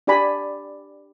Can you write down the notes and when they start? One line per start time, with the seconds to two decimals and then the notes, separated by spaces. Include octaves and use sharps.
0.07 D4 G4 D5 G#5 B5